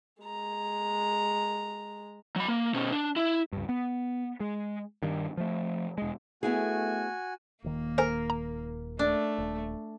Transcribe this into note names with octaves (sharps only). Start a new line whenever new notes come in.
G#3 A#5
F#3 B5
A#3
B2 C#4
D4
E4
C#2 G2
B3
G#3
G2 D#3
F3 A3
E1 G#3
A3 B3 E4 F#4 G#4 G#5
D#1 D#3 A#3
A4 A#4 C5 G#5
A#5
A3 D4
D#1